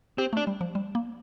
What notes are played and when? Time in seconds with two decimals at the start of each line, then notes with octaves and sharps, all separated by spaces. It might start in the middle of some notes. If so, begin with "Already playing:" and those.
0.18 C4 G4
0.33 A3
0.37 D4
0.47 G3
0.61 F3
0.75 G3
0.95 A#3